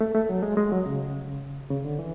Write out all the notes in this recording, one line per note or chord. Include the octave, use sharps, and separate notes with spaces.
A3
A3
F#3
G#3
G#3
F#3
C#3
C#3
D3
E3